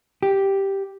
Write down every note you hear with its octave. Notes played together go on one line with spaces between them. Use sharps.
G4